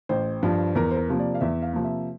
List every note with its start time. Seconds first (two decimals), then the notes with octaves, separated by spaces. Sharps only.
0.09 A1 C5
0.43 G2 F3
0.75 E2 A#4
0.91 C5
0.97 A#4
1.09 C3 F3 A#3
1.19 D5
1.35 F5
1.41 E2 E5
1.62 F5
1.73 C3 F3 A#3
1.84 E5